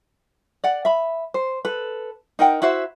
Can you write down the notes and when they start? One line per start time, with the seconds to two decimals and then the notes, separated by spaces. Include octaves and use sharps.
0.64 D5 F#5
0.85 E5 B5
1.34 C5
1.65 A4 B4
2.39 D#4 A#4 F#5 G5
2.62 E4 F#4 C5 E5